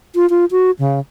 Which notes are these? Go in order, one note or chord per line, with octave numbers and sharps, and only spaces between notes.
F4
F4
F#4
C#3